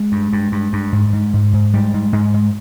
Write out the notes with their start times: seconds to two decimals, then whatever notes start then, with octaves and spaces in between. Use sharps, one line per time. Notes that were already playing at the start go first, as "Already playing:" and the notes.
Already playing: G#3
0.12 G2
0.33 G2
0.52 G2
0.73 G2
0.93 G#2
1.13 G#2
1.33 G#2
1.53 G#2
1.73 G#2 G3
1.94 G#2
2.13 G#2 G#3
2.34 G#2